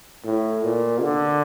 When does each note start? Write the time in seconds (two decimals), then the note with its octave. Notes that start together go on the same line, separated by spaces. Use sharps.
0.25 A2
0.63 A#2
1.02 D3